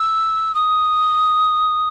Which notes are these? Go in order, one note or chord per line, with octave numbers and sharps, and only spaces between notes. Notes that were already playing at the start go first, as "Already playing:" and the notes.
Already playing: E6
D#6